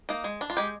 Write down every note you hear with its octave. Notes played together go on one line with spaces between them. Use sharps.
A#3 D#4
G#3
D4
F4
G#3 G4